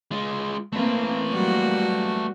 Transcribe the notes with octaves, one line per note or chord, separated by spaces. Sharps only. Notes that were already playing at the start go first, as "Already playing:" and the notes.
G#3 F4
A3 A#3 C4 B4
F#3 G3 A#3 F#4